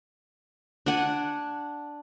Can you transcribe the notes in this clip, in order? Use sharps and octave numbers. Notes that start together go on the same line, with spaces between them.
D4 F#5 G#5